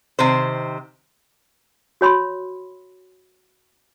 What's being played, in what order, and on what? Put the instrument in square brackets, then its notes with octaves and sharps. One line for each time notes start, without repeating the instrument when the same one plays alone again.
[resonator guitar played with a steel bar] C3 D#3 C5
[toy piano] F#4 C#5 B5 C6